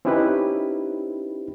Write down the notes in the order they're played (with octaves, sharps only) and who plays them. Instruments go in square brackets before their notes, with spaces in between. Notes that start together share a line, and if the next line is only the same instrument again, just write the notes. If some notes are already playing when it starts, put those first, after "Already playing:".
[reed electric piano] C4 C#4 D#4 E4 G4 B4